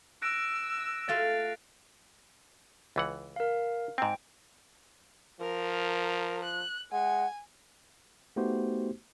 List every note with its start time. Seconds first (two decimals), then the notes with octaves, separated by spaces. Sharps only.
0.22 E6 F#6 A#6 D7
1.09 A3 F4 F#4 F5 A6
2.96 C#2 E3 F#5
3.36 A#4 F5
3.98 G#2 C4 G5 A#5
5.41 F3 A#4
6.44 F#6
6.92 G#3 F#5 G#5
8.36 A3 B3 D#4 F#4 G4 C5